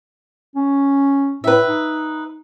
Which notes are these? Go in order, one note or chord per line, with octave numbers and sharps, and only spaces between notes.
C#4
A2 B4 E5
D#4